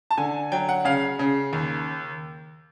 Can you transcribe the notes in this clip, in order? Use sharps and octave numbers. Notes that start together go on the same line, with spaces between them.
A5
D3 G#5
F#3 G5
F#5
C#3 F5
C#3
D#2